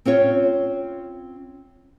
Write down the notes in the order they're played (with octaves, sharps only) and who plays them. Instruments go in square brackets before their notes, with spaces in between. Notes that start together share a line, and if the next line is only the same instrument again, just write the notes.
[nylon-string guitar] C4 C#4 F4 C#5